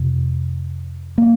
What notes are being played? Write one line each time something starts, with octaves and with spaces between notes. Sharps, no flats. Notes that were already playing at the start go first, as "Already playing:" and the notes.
Already playing: F2 C3
A#3